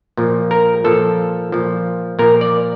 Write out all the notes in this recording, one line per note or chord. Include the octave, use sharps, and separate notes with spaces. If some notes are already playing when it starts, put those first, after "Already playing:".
A#2 F3
A#4
A#2 F3 A4
A#2 F3
A#2 F3 A#4
D5